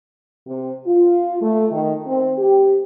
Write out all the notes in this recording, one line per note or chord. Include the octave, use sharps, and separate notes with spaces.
C3
F4
A3
D#3
C4
G4